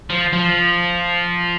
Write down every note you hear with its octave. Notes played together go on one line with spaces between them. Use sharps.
F3
F3